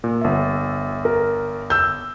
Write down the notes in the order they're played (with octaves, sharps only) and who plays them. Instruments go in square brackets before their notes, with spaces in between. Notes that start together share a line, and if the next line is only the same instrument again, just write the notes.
[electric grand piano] A#2
G1 E5
[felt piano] A#4
E6 G6